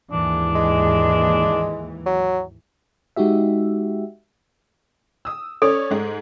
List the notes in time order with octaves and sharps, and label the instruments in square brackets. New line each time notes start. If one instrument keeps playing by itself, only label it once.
[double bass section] D#2 G#2 E3 [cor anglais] D4
[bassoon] G#3
F#3
[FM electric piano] G#3 D#4 F#4 G4 E5
[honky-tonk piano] D#6 E6
[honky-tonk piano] C#4 C#5 D5 [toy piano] A4
[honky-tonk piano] G#2 G#3